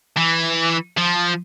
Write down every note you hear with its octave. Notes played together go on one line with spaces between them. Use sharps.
E3
F3